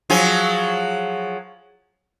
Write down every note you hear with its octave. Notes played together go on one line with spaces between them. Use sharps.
F3 F#3 G#4